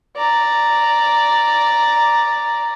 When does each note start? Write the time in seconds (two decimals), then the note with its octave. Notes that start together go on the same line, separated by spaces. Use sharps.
0.17 D5 A#5